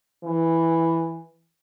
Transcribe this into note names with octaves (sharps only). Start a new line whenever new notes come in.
E3